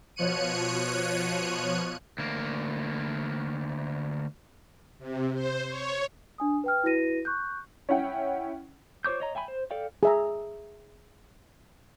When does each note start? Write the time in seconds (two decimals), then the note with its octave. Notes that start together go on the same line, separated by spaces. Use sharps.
0.16 B2 F3 C#5 F#6 C#7 D#7
2.18 D2 A#3
4.99 C3
5.34 C5
5.68 C#5
6.38 D4 G#5 D#6
6.64 B4 G5 F6
6.83 E4 F#4 B4 A#6 D#7
7.25 C#6 F#6 G6
7.89 C#4 E4 F#5 G5
9.05 F4 C5 C#5 D6 G6
9.20 C#5 D#5 A#5
9.35 E5 G5 G#5 B5
9.48 C5
9.71 A4 D5 F5 G5
10.03 G#4 E5 A#5